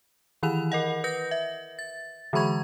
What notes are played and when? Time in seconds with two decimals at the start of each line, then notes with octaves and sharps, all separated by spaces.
0.43 D#3 E3 E4 B5 F7
0.72 A#4 D#5 F#5
1.04 B4 G6 A#6
1.31 E5
1.79 A6
2.33 D3 E3 G#3 B5 C#6 G#6